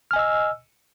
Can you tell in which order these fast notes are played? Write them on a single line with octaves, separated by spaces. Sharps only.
F6 G#5 D#5 E6